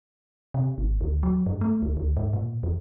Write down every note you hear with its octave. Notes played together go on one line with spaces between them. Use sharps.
C3
G#1
D2
F#3
G2
A3
D2
D2
G#2
A#2
E2